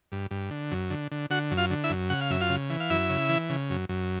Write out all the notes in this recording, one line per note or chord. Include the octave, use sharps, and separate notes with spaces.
G2
G2
D3
F#2
D3
D3
D3 F#4 F#5
F#2
F4 F5
D3
E4 E5
F#2
C#3 F#5
F5
F#2 E5
F4 F5
C#3
E3
F5
F#2 E4 E5
C#3
E3
C#3
F#2
F#2